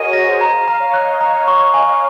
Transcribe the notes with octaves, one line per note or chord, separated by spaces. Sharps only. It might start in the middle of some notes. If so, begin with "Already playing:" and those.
Already playing: F#4 G#4 A#4 C#5 D#5 D#7
C#5 A#6
C5
D#5 A#5
F5
A#5
C#5
D#5 F#6
C#5 A#5
C#6
G#5